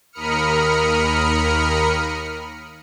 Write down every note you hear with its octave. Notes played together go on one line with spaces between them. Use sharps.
D#2 A#4 B5 D#6 F6 C#7